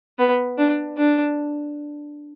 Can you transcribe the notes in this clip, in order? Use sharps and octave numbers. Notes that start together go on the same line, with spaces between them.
B3
D4
D4